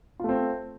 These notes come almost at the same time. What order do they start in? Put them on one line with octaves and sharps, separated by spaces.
F4 A3 C4